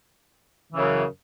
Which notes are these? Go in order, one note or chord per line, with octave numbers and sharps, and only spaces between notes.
F#2 C#3 E3